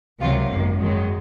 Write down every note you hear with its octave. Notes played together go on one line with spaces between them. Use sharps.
C#2 C3 D#3 F#3 F4
G#1 F#2 D#3 A#3
F#2 D#3 F#3 G#3